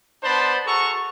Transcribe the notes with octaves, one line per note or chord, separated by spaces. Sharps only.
B3 D4 C5 A5 B5 C6
F#4 G#4 A4 A#5 C#6